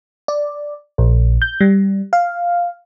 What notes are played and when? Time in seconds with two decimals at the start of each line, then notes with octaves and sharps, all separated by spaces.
0.28 D5
0.98 A#1
1.42 G6
1.61 G3
2.13 F5